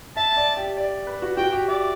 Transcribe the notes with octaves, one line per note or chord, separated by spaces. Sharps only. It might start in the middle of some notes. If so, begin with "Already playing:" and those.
E5 A5
D5
G4
D5
B4
F#4
F#4 G5
G4
D5 E5